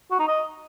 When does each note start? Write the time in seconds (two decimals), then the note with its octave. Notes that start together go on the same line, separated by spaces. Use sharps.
0.11 F#4
0.19 D#4
0.28 D#5